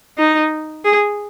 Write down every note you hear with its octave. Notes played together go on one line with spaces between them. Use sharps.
D#4
G#4